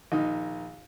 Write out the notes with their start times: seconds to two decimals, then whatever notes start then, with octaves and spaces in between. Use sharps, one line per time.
0.12 A#1 D#3 D#4